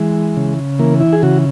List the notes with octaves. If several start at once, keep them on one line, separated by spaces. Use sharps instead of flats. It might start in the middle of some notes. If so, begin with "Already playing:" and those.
Already playing: E3 G#3
C#3
E3 A#3
E4
G#4
C#3 F#4